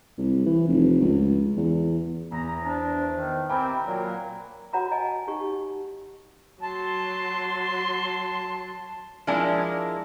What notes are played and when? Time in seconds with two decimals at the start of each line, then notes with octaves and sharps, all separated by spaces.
0.18 C2
0.46 E3
0.68 F1
1.01 C#2
1.57 E2
2.32 E2 A#5
2.64 D4 E4 B4 C5
3.13 D#3
3.50 C4 E4 G4 A#4 G5 G#5
3.86 A#2 F#3 A#4
4.73 F#4 C#5 F#5 A#5 B5 D6
4.91 D#5 G#5 A5
5.28 D#4 G4 C#6
6.62 F#3 A5 C6
9.27 F3 G#3 D4 E4 A#4